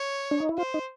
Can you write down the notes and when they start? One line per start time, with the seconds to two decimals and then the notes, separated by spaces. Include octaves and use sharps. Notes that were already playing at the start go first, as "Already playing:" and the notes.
Already playing: C#5
0.31 D4
0.40 D#4
0.49 E4
0.58 F4 C5
0.74 D#4